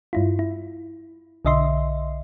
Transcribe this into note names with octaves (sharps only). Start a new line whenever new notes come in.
G2 E4 F4
E4
B1 D3 D#5 E5 C6